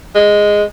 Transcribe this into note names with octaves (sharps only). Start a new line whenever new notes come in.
G#3